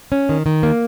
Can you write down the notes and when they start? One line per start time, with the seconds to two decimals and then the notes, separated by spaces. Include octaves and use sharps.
0.12 C#4
0.29 D#3
0.46 D#3
0.63 A#3